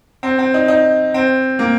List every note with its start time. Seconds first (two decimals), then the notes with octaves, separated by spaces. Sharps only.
0.23 C4
0.39 C4
0.54 D#4
0.68 D#4
1.14 C4
1.59 A#3